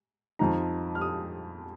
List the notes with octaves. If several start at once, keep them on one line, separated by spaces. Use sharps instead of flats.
F2 F3 D#4 A#5
F6
D#6